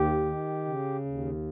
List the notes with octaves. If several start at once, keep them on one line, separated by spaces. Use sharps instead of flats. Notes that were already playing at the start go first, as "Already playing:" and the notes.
Already playing: D#2 G4
D#3
C#3
D#2